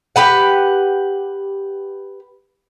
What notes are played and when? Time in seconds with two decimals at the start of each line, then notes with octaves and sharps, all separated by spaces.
0.16 G4 B4 F#5